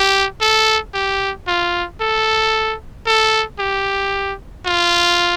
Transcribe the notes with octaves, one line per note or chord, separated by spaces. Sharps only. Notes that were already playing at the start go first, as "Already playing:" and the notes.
Already playing: G4
A4
G4
F4
A4
A4
G4
F4